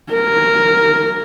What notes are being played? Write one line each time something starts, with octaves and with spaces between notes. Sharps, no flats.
A#4